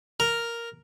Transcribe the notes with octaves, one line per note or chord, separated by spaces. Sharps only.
A#4